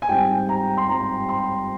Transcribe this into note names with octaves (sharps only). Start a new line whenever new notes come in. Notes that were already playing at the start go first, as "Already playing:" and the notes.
G#5
G#2 G3 C4 G5
A#5
C6
G#2 G3 C4 A#5
C6